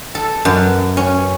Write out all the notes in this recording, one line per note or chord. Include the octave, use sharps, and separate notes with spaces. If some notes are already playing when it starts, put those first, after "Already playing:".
A4
F#2
C#4